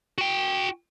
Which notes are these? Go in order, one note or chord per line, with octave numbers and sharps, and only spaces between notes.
F#4 G5